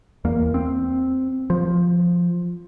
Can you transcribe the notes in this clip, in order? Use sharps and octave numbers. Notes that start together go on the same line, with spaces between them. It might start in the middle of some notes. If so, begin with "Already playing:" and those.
E2 A#3
C4
F3